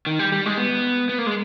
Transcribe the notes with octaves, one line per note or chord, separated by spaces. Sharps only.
D#3
G3
G3
G#3
B3
B3
A#3
G#3